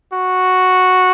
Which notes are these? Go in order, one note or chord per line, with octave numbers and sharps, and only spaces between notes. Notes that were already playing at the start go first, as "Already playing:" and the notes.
F#4